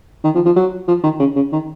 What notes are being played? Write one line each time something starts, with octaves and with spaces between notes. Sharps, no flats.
D#3
F3
F3
F#3
F3
D#3
C#3
C#3
D#3